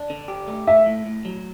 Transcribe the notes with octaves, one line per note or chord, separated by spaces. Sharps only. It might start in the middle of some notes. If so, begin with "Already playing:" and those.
Already playing: D4
D3
G4
A3
A3 E5
A2
A2
F#3